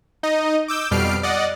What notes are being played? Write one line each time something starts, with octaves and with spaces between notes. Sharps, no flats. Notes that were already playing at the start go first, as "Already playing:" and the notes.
D#4 D#5
D6 E6 G6
F2 B2 G3 F6 C7 D7
D5 D#5 F#5